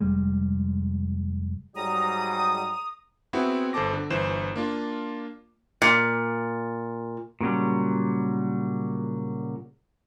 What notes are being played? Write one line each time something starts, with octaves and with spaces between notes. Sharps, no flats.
F1 G3 G#3
G#2 F#3 G3 A#5 D#6
B3 C4 E4 F#4 G#4
G1 A4 C5 A5 D6 A#6
D3
G1 E3 C5 E7
A#3 D4 F4
A#2
A#2 C#3 F#3 G3